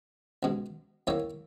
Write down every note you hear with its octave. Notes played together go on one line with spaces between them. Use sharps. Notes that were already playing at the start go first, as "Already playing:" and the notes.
C#2 B2 G#3
E2 D#3 A#3 C#5 E5